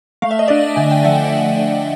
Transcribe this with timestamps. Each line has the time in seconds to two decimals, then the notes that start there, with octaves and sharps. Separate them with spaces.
0.22 A3 F5
0.31 E5
0.39 D#5
0.48 D4 D5 E5
0.76 D3 G#5
0.91 G5
1.04 F3 E5 F#5